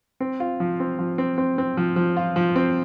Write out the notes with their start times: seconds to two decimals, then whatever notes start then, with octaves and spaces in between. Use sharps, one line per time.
0.20 C4
0.40 F4
0.60 F3
0.80 C4
0.99 F3
1.18 C4
1.38 C4
1.58 C4
1.77 F3
1.96 F3
2.17 F4
2.36 F3
2.56 C4